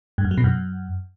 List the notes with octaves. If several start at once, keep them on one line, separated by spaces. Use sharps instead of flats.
G2
F#2
F#3
B2
F#2